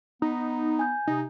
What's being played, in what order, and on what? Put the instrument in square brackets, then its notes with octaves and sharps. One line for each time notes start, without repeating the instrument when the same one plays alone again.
[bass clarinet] B3 [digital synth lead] D#4
[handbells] G#5 G6
[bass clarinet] C3 [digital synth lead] D#4